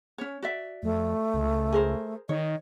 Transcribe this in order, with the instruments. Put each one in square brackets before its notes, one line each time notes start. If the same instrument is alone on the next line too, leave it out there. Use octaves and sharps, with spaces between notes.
[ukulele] C#4 C#5
F#4 D5 E5
[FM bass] F2 [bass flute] A3
[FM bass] C#2
[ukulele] G#4 A#4 C5
[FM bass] D#3 [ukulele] C#5 [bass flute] D#5